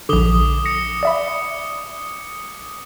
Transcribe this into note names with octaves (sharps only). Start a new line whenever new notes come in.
A#1 D3 D6 D#6 G7
A#6 C#7
D5 E5 B5